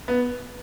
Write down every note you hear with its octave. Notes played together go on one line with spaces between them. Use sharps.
B3